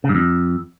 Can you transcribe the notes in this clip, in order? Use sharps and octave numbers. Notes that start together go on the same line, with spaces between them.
C#3
G2
F2